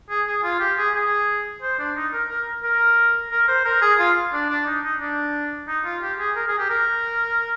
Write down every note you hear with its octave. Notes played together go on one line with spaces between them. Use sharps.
G#4
G#4
F4
G4
G#4
G#4
C5
D4
D#4
A#4
A#4
A#4
A#4
C5
A#4
G#4
F4
D4
D4
D#4
D#4
D4
D#4
F4
G4
G#4
A#4
G#4
G4
A#4